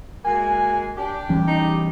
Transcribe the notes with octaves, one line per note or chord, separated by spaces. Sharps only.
G#3 A#3 F#4 G#5
D4 G4
E3 G3 C#4
D#4